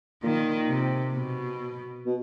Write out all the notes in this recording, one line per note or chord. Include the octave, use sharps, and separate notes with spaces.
A#2 D#3
C3
B2
B2